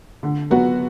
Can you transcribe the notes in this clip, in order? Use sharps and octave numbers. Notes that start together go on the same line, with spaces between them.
D3
F#3 B3 F#4